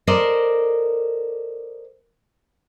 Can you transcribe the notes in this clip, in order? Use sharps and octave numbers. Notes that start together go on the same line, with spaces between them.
A4 A#4 C5 D5 D#5